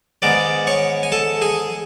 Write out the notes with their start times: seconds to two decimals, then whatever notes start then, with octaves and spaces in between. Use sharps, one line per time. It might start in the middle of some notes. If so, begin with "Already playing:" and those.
0.22 G#2 D#3 G#3 B3 D5 D6
0.67 C#5 C#6
1.03 G#5
1.12 A4 A5
1.41 G#4 G#5